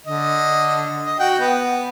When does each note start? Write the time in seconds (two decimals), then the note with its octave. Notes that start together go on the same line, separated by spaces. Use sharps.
0.06 D3 D#5
1.05 D#5
1.20 F#4 F#5 G5
1.39 B3